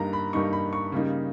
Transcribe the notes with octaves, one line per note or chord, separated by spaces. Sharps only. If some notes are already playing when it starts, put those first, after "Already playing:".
Already playing: G2 G3 A#3 D#4 A#5
B5
G2 G3 A#3 D#4 C#6
B5
C#6
C#3 G3 A#3 D#4